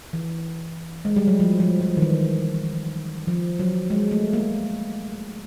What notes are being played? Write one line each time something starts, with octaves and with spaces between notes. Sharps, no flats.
E3
G#3
G3
F#3
F3
F3
F3
D#3
E3
F3
F#3
G#3
A3
A#3